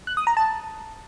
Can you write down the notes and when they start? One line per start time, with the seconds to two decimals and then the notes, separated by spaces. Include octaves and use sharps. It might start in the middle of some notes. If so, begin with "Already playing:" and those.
0.07 F#6
0.17 D#6
0.27 A#5
0.37 A5